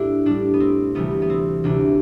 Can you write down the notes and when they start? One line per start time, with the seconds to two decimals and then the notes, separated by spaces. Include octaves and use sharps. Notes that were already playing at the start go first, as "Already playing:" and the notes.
Already playing: A2 G3 D4 E4
0.25 A2 G3 D4
0.54 B3
0.60 C4
0.95 D2 C3 E3 G3 B3
1.22 B3
1.30 C4
1.64 D2 C3 E3 G3 D4